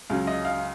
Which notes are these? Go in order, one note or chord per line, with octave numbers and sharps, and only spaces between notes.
C#2 C#3 F#3 F5
D#5
F5